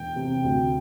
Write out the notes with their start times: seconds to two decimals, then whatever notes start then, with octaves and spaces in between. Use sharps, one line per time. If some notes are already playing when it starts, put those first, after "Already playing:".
Already playing: E1 G5
0.16 C3
0.44 D2